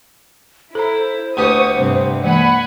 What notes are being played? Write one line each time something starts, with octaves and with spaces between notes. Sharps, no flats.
E4 A4 C5 A#5
D2 B3 G4 C#6 D#6
G2 C3
E3 G#3 A#3 F#5 G#5 B5